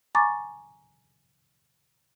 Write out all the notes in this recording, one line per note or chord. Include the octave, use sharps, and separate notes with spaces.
G#5 A#5 C#6 D6 A6